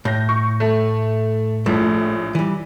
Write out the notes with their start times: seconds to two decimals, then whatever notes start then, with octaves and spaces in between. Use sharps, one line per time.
0.05 A2 G6 A#6
0.29 C#6
0.60 A3
1.66 A#1 A2 A3
2.35 E3 G3